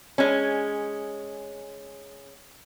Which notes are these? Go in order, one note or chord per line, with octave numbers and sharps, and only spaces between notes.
G#3 C#4